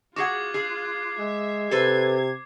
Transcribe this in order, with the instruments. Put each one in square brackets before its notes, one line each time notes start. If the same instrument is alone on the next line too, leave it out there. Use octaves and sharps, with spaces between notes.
[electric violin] F4 F#6 [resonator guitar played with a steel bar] F#4 G#4 F#5 [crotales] D6 G#6
[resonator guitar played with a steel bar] G#4 [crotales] C7
[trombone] G#3 [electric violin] E5
[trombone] C3 [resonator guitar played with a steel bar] A4 B4 C5 [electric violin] G#6